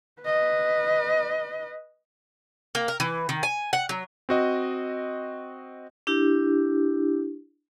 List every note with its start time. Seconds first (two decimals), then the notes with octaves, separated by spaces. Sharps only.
0.22 B4 D#5
2.75 A#3
2.88 A#4
3.00 E3
3.29 D#3
3.43 G#5
3.73 F#5
3.89 F#3
4.29 C4 F#4 D#5
6.07 D4 E4 G4